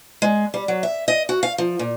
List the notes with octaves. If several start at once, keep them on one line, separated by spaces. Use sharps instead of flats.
G#3
G3
F#3
E5
D#5
F#4
F5
F3
A#2